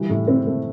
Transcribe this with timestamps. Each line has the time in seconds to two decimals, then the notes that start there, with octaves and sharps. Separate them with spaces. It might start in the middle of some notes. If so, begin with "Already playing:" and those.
Already playing: E3 G3
0.10 A2
0.27 C4
0.47 A3